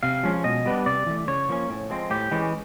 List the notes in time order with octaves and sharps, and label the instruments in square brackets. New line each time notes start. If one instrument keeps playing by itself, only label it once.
[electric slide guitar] C3 F5
F3 G#3 C#4
B2 D#5
G3 B3 D4
C3 D5
E3 A3
C#3 C#5
F3 A#3 C#4
A2
F3 G#3 C4
A2 G4
E3 G#3 C#4